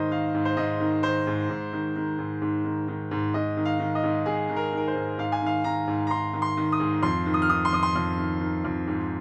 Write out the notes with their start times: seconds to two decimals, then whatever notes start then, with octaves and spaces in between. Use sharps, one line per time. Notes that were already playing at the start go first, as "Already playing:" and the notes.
Already playing: G#2 D#3 C5 D#5
0.11 D#3 F5
0.34 G#2
0.45 C5
0.57 G#2 D#5
0.80 D#3
1.03 D#3 C5
1.27 G#2
1.50 G#2
1.73 D#3
1.96 D#3
2.19 G#2
2.42 G#2
2.65 D#3
2.88 D#3
3.11 G#2
3.34 G#2 D#5
3.57 D#3
3.65 F5
3.80 D#3
3.95 D#5
4.03 G#2
4.26 G#2 G#4
4.49 D#3
4.56 A#4
4.73 D#3 A#4
4.88 C5
4.95 G#2
5.18 G#2 F5
5.32 G#5
5.42 D#3 F5
5.64 D#3 A#5
5.88 G#2
6.07 A#5
6.11 G#2 C6
6.33 D#3
6.42 C6
6.57 D#3
6.72 D#6
6.80 G#2
7.02 F2 C6
7.26 D#3
7.34 D#6
7.42 F6
7.49 D#3 D#6
7.65 C6
7.72 F2 D#6
7.83 C6
7.96 F2
8.18 D#3
8.41 D#3
8.65 F2
8.87 G#2